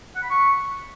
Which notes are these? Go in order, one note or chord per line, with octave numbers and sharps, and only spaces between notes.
F#5
B5
C#6